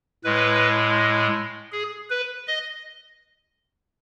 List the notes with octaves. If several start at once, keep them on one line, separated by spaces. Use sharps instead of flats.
A2 G#3 B4
G#4
B4
D#5